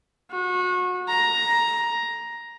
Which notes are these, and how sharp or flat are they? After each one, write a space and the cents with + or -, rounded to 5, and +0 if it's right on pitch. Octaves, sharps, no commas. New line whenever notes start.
F#4 -30
A#5 +10